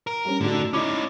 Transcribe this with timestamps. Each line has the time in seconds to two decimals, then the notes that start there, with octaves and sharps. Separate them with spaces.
0.07 A#4
0.25 G3 C#4
0.41 A2 D3 D4 D#4 F#4
0.73 C#4 D#4 E4 B5 D6